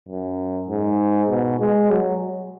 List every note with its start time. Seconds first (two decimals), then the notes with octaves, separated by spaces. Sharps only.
0.09 F#2
0.68 G#2
1.30 B2
1.60 G#3
1.90 F#3